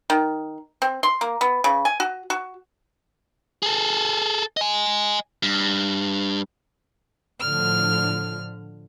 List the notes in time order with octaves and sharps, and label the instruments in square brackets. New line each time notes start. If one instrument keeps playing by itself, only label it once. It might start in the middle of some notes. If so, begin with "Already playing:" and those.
[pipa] D#3
C4
C6
A#3
B3
C#3
G#5
F#4
F#4
[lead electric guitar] G#4 A4
D#5 G#5
G2
[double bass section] A2 D3 F3 [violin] F6